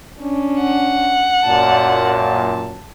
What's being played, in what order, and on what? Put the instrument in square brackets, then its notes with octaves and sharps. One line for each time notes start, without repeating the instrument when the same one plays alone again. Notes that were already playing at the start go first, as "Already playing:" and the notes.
[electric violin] C#4 D4
[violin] F#5
[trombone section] F#2 A#2 [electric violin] D5 A5
[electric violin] A5